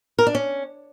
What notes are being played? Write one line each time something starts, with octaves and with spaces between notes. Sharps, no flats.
A#4
D4
C#4